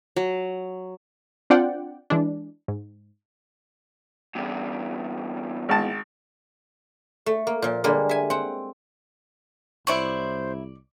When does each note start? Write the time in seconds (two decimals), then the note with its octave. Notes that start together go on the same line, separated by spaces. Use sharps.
0.16 F#3
1.50 C4 D4 F4 D5 F#5 G5
2.10 E3 G#3 D4
2.68 G#2
4.35 E2 G2
5.69 G#1 A5
7.26 A3
7.47 A#3
7.62 A#2 F3
7.84 D3 G3 G#3 A#3
8.09 E5 G#5
8.30 C4 F#5
9.87 C2 F#3 E4 C5 D5 C#6